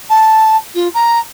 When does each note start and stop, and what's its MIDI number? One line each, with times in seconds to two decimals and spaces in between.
0.09 0.56 81
0.74 0.88 65
0.94 1.19 82